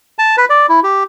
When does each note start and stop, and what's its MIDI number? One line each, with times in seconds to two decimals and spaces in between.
0.19 0.36 81
0.37 0.45 71
0.50 0.66 74
0.69 0.80 64
0.83 1.04 67